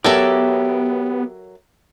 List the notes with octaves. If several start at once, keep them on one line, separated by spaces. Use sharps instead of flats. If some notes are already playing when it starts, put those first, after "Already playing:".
F#3 B3 G4 A4 A#4 C#5 D5 E5